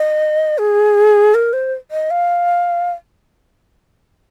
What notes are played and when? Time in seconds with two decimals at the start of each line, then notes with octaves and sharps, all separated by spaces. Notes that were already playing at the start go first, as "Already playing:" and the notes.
Already playing: D#5
0.58 G#4
1.34 A#4
1.53 C5
1.91 D#5
2.11 F5